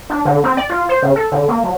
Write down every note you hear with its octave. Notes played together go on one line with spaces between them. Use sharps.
D4
D3
C4
D5
F4
C5
C#3
A4
D3
A#3
F#3